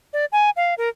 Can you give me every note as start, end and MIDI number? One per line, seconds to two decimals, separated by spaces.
0.13 0.25 74
0.32 0.50 80
0.56 0.74 77
0.78 0.89 70